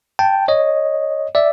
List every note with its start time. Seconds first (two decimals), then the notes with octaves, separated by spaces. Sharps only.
0.19 G5 A5
0.48 C#5 D#5
1.35 D5 E5